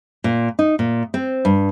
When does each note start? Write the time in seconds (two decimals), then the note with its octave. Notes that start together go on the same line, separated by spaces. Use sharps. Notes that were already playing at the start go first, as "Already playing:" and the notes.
0.24 A#2
0.59 D#4
0.79 A#2
1.14 C4
1.45 G2